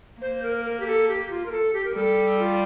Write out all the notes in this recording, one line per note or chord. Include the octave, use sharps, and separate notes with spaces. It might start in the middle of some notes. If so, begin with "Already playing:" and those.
A#3 C5
A#4
A#4
G4
A4
G4
F4
A#4
A4
G4
A#4
G3 A4
F4